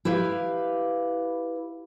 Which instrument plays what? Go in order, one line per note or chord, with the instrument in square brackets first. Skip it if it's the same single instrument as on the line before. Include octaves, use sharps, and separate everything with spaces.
[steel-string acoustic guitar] E4 G4 B4 F5